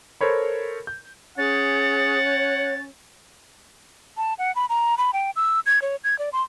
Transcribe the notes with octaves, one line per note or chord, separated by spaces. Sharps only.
A4 A#4 C5 C#5 B5
G6
C#4 G#4 F#5 A6
C#5
A5
F#5
B5
A#5
B5
G5
E6
G#6
C#5
G#6
D5
C6